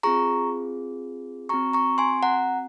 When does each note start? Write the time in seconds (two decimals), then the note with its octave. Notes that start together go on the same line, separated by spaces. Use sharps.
0.03 C4 F4 G#4 A#5 C#6
1.49 F#4 A#5 C#6
1.54 C4
1.73 A#5 C#6
1.98 G#5 C6
2.23 F#5 A#5